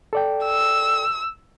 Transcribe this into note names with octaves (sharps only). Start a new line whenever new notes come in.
A4 D5 G5
E6